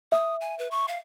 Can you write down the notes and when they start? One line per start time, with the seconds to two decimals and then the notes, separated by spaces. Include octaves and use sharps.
0.12 E5 D#6
0.41 G#5
0.59 B4
0.71 C#6
0.88 F5